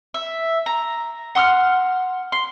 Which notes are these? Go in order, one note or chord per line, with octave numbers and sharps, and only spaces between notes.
E5
A#5
F#5 C6 D#6 F6
C6